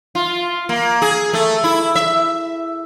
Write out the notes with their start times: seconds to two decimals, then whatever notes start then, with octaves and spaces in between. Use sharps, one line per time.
0.15 F4
0.69 A#3
1.02 G#4
1.34 A3
1.64 E4
1.95 E5